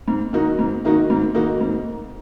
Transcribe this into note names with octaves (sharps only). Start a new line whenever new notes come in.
G#2
D#3 A#3 D#4 F#4
G#2
D#3 A#3 D#4 F#4
G#2
D#3 A#3 D#4 F#4
G#2